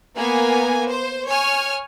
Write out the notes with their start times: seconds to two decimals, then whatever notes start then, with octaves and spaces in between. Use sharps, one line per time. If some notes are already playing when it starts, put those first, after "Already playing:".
0.15 A#3 B3 G#5
0.90 C5
1.29 C#5 G#5 F6